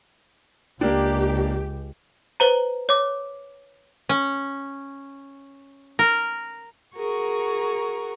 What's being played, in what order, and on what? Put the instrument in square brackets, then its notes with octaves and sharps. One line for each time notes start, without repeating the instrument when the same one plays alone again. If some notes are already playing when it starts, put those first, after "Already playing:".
[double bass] C#2 [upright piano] A#3 D4 [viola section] G4
[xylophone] B4 C5 A#5
C#5 D6
[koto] C#4
A#4
[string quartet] F#4 G#4 A#4 C#6